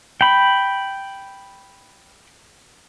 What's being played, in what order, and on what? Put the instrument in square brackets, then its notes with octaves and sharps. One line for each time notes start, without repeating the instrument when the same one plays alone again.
[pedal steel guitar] G5 B5